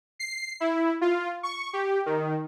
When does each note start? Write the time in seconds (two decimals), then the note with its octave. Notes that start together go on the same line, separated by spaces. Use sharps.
0.19 C7
0.60 E4
1.01 F4
1.43 C#6
1.73 G4
2.06 D#3